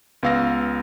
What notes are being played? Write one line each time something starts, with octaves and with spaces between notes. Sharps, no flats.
C#2 B3 F5 E6 A#6